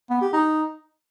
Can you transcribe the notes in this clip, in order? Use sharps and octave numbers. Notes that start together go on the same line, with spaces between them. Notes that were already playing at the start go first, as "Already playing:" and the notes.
B3
G4
D#4